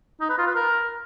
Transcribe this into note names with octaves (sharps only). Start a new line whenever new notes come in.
D#4
B4
F4
B4
A#4